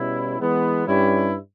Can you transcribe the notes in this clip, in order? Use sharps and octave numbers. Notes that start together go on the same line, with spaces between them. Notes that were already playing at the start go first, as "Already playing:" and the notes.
Already playing: B2 G3 C#4 E4
E3 G#3 B3
G2 G3 C#4 E4